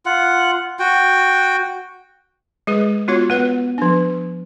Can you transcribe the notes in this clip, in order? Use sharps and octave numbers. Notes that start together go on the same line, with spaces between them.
F4 F#5
F#4 G5
G#3 G#4 B4
B3 F4 F#4 C#5
B3 B4 F#5
F3 D4